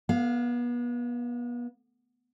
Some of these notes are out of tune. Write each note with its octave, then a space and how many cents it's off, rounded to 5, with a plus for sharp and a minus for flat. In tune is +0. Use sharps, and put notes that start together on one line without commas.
B3 -35 F5 -5